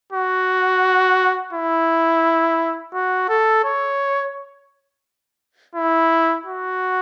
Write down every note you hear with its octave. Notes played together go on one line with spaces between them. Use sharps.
F#4
E4
F#4
A4
C#5
E4
F#4